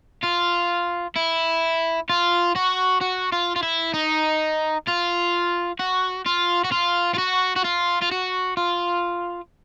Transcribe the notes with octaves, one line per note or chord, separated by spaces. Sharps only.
F4
E4
F4
F#4
F#4
F4
F4
E4
D#4
F4
F#4
F4
F#4
F4
F4
F#4
F#4
F4
F4
F#4
F4